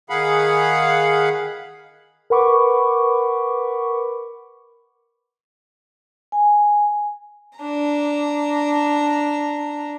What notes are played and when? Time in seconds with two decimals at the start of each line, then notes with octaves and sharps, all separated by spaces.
0.10 D#3 G#4 F5 F#5 B5
2.30 A#4 B4 F#5 B5 C#6 D6
6.32 G#5
7.58 D4 A#5